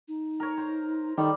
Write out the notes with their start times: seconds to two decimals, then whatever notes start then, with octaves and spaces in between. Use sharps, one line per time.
0.08 D#4
0.40 A#4 C#5
0.58 C5
1.17 D#3 G3 A4